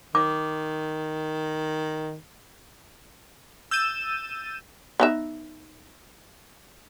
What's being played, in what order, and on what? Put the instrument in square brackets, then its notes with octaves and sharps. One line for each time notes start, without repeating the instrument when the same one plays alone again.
[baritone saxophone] D#3 [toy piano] D6
[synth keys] E6 G6 A6 D#7 E7
[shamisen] B3 D#4 E5